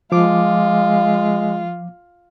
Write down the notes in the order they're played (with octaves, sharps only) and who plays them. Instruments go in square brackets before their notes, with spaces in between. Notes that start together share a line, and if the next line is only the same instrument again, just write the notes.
[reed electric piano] F3 D6 [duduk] G#3 [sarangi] F4